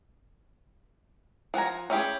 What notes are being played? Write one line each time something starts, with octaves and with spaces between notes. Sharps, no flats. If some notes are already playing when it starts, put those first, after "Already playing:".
F3 F#5 G#5 A#5
C#4 E4 G4 G#4